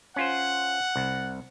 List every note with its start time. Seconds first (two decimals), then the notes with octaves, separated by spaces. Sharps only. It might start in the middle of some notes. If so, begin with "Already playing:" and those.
0.16 C#4 F4 C5 F#5
0.96 C2